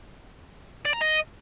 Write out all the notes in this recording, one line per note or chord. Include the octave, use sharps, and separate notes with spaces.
D5
A#5
D#5